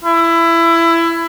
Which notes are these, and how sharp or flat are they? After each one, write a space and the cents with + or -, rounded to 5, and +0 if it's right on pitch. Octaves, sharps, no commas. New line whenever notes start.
E4 +20